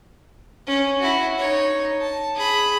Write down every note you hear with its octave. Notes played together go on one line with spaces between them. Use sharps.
C#4
E4 F#4
D#4 C#5
A5
G#4 B5